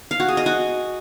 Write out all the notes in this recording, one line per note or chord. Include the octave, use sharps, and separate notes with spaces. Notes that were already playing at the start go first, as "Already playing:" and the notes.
F5
F#4
G#4
D#5
F#4